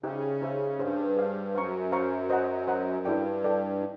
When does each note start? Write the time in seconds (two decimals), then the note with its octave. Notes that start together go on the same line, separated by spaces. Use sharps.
0.03 C#3 D#4 G4 C5 E5
0.42 D#4 G4 C5 E5
0.79 G2 G#4 C5 F5
1.17 G#4 C5 F5
1.55 F#2 C5 F5 A#5 C#6
1.92 C5 F5 A#5 C#6
2.30 C5 D#5 F#5 A#5
2.67 C5 D#5 F#5 A#5
3.05 G2 E4 A4 D5 G5
3.44 E4 A4 D5 G5
3.81 D#4